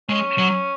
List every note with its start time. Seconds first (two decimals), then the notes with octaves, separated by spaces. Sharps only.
0.09 G#3 C#4
0.38 F#3